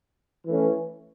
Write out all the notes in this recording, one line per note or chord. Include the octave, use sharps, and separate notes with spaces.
E3 A3 C#4